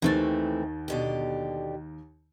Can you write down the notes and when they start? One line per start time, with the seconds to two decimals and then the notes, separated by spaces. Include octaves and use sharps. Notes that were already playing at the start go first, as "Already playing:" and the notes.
0.02 D#2 D#3 E3 A3 C4 A6
0.88 B2 D3 G4